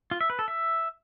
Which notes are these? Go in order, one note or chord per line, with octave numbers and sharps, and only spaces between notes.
F4
E5
B4
A4
E5